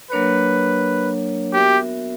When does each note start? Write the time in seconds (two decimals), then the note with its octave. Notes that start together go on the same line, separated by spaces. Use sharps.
0.11 F#3 A#3 D4 A#4 B4 C#5
1.53 B3 F#4 G4 A#4 E5